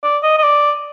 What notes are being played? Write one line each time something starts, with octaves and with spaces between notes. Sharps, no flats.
D5
D#5
D#5
D5